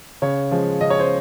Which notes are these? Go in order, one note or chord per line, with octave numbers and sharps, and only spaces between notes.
C#3 C#5
F3 G#3
C#3 D#5
C#5
C5